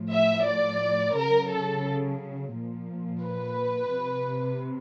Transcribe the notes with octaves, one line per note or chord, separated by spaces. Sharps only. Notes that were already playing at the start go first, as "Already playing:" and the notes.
Already playing: A2 F3
E5
D5
C#3 F#3 A#4
A4
A#2 F3
B4
C3